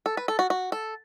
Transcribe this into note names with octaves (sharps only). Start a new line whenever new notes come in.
A4
B4
A4
F#4
F#4
A4